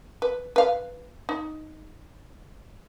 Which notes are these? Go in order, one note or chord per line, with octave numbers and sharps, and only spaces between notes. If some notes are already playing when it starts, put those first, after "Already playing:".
B4
B4 F5
D#4